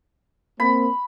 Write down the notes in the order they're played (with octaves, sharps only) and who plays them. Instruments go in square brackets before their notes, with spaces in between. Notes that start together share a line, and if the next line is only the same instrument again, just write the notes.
[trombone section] A#3 C4 [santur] B5